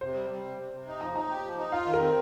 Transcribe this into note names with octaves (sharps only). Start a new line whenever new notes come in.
C3 C5
G3
G3
C3
C3
C3
D#4
F3 A#5
D#4 A#5
G4
F3
D#4
F4 F5
D#3
A#4
C4